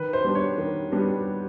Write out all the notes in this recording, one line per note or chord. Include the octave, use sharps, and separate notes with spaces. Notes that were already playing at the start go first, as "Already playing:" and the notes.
Already playing: D#3 B4
C5
G3 B3 D4
C#5
D#3
G3 B3 D4